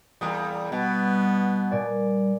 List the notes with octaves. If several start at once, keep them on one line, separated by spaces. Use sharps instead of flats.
E2 A#2 G3 D#6
B2 G3 B3
A#2 D5 G#5